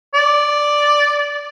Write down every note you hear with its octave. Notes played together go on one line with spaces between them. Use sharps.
D5